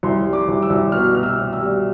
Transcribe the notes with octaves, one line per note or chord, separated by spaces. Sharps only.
C2 C6
G3
D6
C2
E6
C2
B2 F6
B2 F6
E6
B2
E6
G3